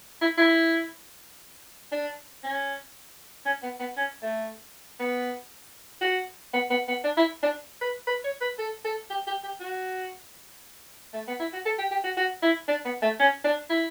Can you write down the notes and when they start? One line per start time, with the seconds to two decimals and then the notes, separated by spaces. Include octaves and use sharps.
0.21 E4
0.38 E4
1.92 D4
2.43 C#4
3.45 C#4
3.63 B3
3.80 B3
3.96 C#4
4.23 A3
5.00 B3
6.01 F#4
6.53 B3
6.70 B3
6.88 B3
7.04 D4
7.17 E4
7.43 D4
7.81 B4
8.07 B4
8.24 C#5
8.41 B4
8.59 A4
8.84 A4
9.10 G4
9.27 G4
9.44 G4
9.60 F#4
11.14 A3
11.28 B3
11.40 E4
11.53 F#4
11.65 A4
11.78 G4
11.91 G4
12.04 F#4
12.17 F#4
12.43 E4
12.68 D4
12.85 B3
13.02 A3
13.19 C#4
13.44 D4
13.70 E4